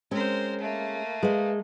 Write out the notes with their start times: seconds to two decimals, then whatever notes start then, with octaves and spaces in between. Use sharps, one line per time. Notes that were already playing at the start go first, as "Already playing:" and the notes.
0.11 G#3 C4 C#4 A#4 C5
0.61 A3 A#3
1.23 G#3 B4 F5